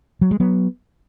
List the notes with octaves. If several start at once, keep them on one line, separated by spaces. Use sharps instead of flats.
F#3
G#3
F#3 B3